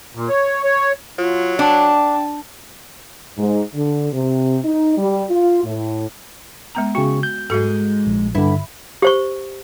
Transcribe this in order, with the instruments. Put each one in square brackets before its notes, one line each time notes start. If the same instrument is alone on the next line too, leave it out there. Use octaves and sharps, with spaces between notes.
[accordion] A#2
C#5
C#5
[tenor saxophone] F#3 [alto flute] F4
[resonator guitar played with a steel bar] D4 [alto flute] G5 [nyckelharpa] A5
[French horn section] G#2
D3
C3
D#4
G3
F4
A2
[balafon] G#3 B3 A#5
[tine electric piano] C#3 C#6 [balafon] F#4 G5
[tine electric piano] G6
[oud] G#2 G#3 [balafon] F#4 A4
[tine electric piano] A#1
[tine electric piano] G2 D3 [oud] E4
[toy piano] G4 C5 C#6